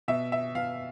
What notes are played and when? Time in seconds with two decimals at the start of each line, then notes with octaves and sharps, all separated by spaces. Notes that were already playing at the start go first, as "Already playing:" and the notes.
0.08 B2 E5
0.32 E5
0.55 B2 F5